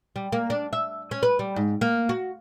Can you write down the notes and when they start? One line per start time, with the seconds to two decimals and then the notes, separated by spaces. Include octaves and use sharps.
0.16 G3
0.32 A#3
0.50 D4
0.73 E5
1.11 C#4
1.23 B4
1.39 G3
1.56 G#2
1.81 A#3
2.09 F#4